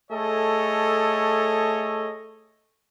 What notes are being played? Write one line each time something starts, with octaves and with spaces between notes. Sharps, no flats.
A3 G#4 A4 C#5 D#5